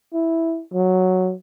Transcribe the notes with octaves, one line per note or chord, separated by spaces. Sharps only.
E4
F#3